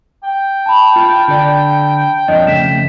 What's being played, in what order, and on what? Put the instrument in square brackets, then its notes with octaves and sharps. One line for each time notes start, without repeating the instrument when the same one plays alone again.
[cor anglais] G5
[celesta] A5 B5
[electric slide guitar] F4
D3 A4 D5
[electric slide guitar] F2 D4 C#5 [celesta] D#5
[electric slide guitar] F2 C#3 A3 [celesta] B6 E7